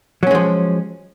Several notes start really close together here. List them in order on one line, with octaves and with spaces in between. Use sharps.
F#3 C#4 G#3 F3